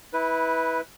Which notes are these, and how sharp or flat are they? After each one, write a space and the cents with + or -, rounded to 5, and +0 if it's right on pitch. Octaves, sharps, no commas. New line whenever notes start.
E4 -25 B4 +0